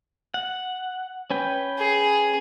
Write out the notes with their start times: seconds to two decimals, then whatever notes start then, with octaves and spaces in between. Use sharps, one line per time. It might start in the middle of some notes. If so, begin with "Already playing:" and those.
0.34 F#5
1.31 C#4 B4 G5
1.79 G#4